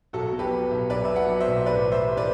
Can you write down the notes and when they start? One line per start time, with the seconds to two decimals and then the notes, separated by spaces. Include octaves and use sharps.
0.13 B1 F#4 A4
0.33 B2
0.39 G4 B4
0.52 F#3
0.71 B1
0.90 B1 B4 D5
1.05 B2 E5
1.16 D5 F#5
1.28 F#3
1.41 C5 E5
1.48 B1
1.66 A2 B4 D5
1.86 E3
1.92 C5 E5
2.05 G3
2.17 B4 D5